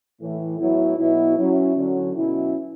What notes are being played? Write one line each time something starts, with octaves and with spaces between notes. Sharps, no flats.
A2 E3 A3
A2 F#3 B3 E4
B2 F#3 B3 E4
F#3 C#4 E4
D3 F#3 C#4
B2 F#3 C#4 E4